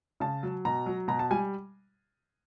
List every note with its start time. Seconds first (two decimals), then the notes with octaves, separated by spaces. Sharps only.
0.20 C#3 A5
0.43 F#3
0.65 B2 A#5
0.86 F#3
1.08 B2 A#5
1.19 A5
1.31 G3 G#5